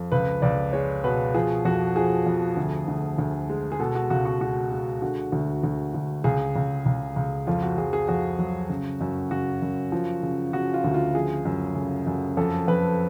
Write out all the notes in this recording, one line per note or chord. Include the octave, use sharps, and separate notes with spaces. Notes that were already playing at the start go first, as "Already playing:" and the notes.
Already playing: F2
C#2 B4
C#2 D5
G#3 C#5
B2 B4
F3 G#4
F2 F#4
F3 G#4
F2
D2
D2
D2
G#3
G#4
B2 A4
F#4
C#2 F#4
F#4
G#3 F#4
G#3
D3 F#4
D2
D2
D2
C#2 G#4
C#2
C#2
C#2
F2 F4
F#4
F2 G#4
G#4
F2 F#4
F#3
C#3
F#2
C#3 F#4
F#2
F3
C#3
C#3 F#4
F4
D2
F4
F3 G#4
F#2
C#3
F#2
F2 A4
F2 B4